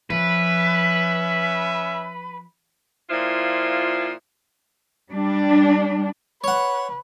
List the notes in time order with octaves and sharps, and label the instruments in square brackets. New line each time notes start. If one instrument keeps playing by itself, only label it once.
[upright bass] F3 [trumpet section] C#4 E5 [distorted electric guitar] B4
[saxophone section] A#2 F3 E4 F4
[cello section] G3 D4
[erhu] B4 [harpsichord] C#5 F#5